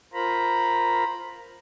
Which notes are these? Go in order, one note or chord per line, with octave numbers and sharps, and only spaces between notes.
F4 A#4 C5 A#5 B5